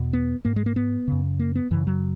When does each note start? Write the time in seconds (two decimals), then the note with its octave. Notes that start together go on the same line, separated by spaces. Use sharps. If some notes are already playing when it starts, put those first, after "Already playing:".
Already playing: E2 B2
0.13 B3
0.45 G#2 A#3
0.56 G#3
0.66 A#3
0.76 B3
1.08 F#2 C#3
1.39 A#3
1.55 B3
1.71 F#2 C#3 E3
1.87 F#3